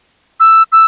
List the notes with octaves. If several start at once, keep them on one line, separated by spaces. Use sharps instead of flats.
E6
E6